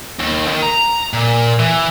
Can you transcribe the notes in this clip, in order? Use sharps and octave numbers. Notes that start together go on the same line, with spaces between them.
D#2
D#3
A#5
A#2
E3